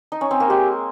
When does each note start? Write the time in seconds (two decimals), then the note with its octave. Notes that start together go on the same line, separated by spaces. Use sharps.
0.12 D#4
0.21 C#4
0.31 C4
0.40 A#3
0.50 G#3 G4